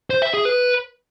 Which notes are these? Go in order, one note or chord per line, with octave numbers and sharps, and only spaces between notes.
C5
E5
G#4
B4